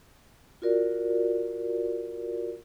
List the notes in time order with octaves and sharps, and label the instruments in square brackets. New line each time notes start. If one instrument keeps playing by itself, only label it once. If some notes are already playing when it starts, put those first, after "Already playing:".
[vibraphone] F4 F#4 A#4 D5